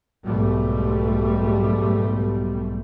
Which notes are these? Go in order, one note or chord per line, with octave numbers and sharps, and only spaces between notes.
B1 G#2 B2 G3 A3